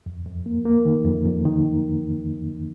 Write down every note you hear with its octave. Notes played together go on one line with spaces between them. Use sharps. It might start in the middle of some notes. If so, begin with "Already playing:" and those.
F2
F2
A#3
A#3
D#3
F2
F2
D#3